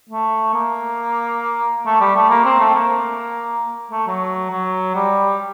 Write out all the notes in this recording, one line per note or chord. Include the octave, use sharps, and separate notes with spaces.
A3
A#3
A3
G3
A3
A#3
C4
A3
A#3
A3
F#3
F#3
G3